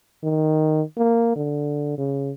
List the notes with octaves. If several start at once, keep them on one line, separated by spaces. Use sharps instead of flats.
D#3
A#3
D3
C#3